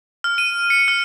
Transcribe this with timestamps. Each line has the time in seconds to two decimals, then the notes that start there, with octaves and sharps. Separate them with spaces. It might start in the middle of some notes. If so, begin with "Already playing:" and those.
0.24 F6
0.38 D#7
0.70 C#7
0.88 F6